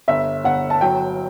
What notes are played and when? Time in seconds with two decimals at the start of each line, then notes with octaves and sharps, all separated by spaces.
0.08 G1 E5
0.44 G1 F#5
0.70 A5
0.81 F#3 G5